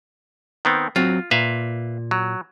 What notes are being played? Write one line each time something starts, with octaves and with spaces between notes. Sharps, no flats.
D#3 B3 C4
F#3 C4 F4
A#2 B4 E5 F5
F#3